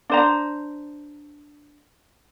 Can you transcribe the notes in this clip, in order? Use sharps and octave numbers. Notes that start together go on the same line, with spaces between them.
D4 C5 A#5